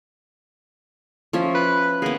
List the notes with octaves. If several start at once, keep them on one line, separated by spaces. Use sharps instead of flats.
F3 C#4 E5
B4
A#3 B3 G#4